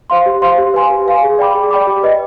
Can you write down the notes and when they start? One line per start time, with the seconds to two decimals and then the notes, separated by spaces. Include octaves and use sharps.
0.10 C5 F5 C6
0.26 G4
0.42 C5 F5 C6
0.58 G4
0.74 B4 F5 G#5 C6
0.90 G4
1.06 B4 F5 G#5 C6
1.23 G#4
1.39 D5 G5 B5 D6
1.55 G#4
1.71 D5 G5 B5 D6
1.87 G4
2.03 B4 D#5